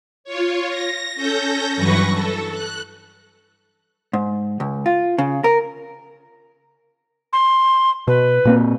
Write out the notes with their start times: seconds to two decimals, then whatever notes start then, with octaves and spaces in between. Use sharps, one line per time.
0.24 F4 C#5
0.68 A#6
1.15 C#4 A4 G6 A#6
1.76 G2 E3 F#3 B4 C#6 A#6
2.13 A4
2.50 F#6
4.13 G#2
4.60 C#2
4.86 F4
5.18 C#3
5.44 A#4
7.33 C6
8.07 B2 B4
8.45 A#2 A#3 C4